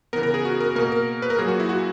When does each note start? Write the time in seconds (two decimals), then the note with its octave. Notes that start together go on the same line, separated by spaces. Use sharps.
0.13 C#3 E3 B3 A#4
0.23 A#4
0.34 G#4
0.45 F#4
0.60 A#4
0.75 B2 A#3 A#4
0.92 A#4
1.22 B4
1.30 A#4
1.38 A#2 F#3 A#3 G#4
1.48 F#4
1.60 E4
1.69 F#4